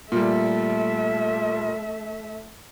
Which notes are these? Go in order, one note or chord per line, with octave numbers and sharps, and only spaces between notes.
A#2 G3 A3 E5